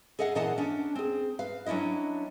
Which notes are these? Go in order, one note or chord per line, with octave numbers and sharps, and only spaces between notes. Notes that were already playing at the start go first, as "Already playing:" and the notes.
G#4 A4 D#5 F5 F#5
A#2 E3 G#4 D#5 F#5 A5
C#4 D4
C4 G#4
B4 F5
F#3 C#4 D4 E4 D#5